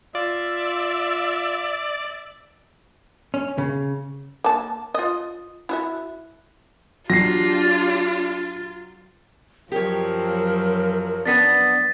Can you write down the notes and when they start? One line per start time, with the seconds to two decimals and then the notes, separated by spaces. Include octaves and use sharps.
0.15 F4 D5 E5
3.34 C#4
3.58 C#3
4.44 A#3 A5
4.94 F4 D#5
5.69 E4 F#4 E5
7.10 F#3 D4 F4 G4 A#6 C7
9.72 F#2 F3 F#3 G4 A#4 C#5
11.25 B3 C#4 D4 A6 B6 D#7